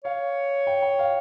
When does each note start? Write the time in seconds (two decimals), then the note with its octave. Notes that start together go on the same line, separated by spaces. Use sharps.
0.04 C#5 F5
0.67 G5
0.83 G5
0.99 F5